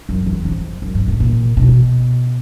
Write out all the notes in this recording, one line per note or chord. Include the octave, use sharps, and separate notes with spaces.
F#2
E2
F2
F#2
G#2
A2
A#2
B2